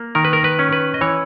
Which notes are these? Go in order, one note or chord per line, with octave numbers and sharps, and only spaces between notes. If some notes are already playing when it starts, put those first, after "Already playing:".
Already playing: A#3
D#3 A#4
B4
A#4
B4
C#4
B4
D#5
E3 C#5